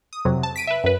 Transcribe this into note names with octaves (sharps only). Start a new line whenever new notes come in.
D#6
F2 C3 F#3
A5
B6 D7 D#7
B4 E5
F#2 B4